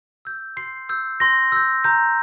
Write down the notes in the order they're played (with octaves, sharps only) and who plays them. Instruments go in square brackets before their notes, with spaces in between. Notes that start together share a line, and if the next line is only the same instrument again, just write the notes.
[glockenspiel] E6 G6
C6 C7
E6 G6
C6 A#6
E6 G6
A#5 G6